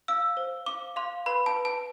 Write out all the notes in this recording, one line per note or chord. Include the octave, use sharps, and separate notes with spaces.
F5 E6
C5
F5 D6
F5 C6
B4 B5
A5
B4
A5